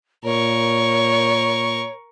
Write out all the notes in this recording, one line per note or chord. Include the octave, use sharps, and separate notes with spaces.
A#2 A#4 C#5 C#6